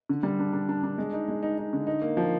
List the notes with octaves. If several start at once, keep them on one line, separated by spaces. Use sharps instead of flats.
D3
G3
D4
D4
D4
D4
G#3
D#4
G#3
D#4
D#4
D3
D#4
A#3
F3